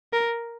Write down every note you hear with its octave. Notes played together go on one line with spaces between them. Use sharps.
A#4